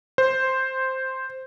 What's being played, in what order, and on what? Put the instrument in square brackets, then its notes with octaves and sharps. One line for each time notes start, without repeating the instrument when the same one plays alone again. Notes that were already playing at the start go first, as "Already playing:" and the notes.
[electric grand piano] C5